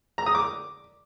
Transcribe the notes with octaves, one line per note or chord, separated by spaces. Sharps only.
A#5
D#6
D6